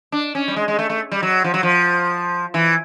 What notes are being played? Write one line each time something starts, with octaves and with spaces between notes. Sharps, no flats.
D4
C#4
G3
G#3
G#3
A3
A3
G3
F#3
F3
F#3
F3
E3